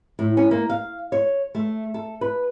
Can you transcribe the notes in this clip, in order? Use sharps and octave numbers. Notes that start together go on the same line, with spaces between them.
A2
C#4
A#3
F5
C#5
A3
A4
B4